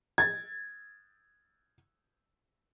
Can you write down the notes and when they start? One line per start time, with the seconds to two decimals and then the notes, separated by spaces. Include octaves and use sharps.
0.18 G#6 A6